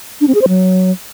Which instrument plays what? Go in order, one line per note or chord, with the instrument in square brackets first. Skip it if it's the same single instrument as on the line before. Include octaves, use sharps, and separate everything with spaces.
[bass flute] D4
C4
G#4
C5
F#3